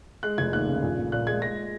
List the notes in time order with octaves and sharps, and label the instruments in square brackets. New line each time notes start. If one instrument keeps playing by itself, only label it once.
[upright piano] G#3 F#6
F1 G#6
D#2 F#6
C#3
A#1
A#1
A#2 F#6
G#3 G#6
G#3 A#6